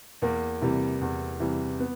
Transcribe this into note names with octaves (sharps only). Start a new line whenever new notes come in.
E2 A#3
C3 E3 G3
E2
C3 E3 G3
B3